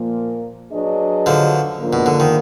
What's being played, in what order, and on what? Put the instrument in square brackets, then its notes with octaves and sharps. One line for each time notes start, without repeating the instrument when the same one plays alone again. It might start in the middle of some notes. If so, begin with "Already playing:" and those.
Already playing: [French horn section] A#2 F3 A#3
F#3 D4 G#4 B4 D#5
[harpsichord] D3 F3
[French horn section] G#2 F3 A#3 D4 F4
[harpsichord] B2
D3
D#3